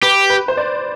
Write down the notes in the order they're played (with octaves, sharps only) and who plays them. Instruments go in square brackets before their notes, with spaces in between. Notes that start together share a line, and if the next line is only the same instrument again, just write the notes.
[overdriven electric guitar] G4 [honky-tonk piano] B4
[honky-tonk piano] B4
C5
D5